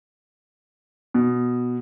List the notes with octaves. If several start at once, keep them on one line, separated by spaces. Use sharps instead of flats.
B2